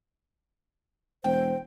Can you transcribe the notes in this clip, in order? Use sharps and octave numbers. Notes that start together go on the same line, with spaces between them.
E1 C5 G5